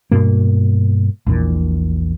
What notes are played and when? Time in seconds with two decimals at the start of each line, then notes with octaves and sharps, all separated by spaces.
0.11 G2 B2 A#3
1.27 A#1 E2 A#2